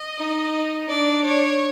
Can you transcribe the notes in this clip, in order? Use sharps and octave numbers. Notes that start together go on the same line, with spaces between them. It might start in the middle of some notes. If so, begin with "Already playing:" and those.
Already playing: D#5
D#4
D4 D5
C#5